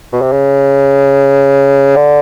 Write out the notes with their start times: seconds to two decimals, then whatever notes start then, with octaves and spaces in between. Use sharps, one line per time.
0.12 B2
0.21 C3
0.32 C#3
1.96 D3